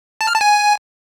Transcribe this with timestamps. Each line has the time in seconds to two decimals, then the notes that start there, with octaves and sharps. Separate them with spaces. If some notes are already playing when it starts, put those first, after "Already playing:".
0.21 A5
0.27 F6
0.34 A5
0.41 G#5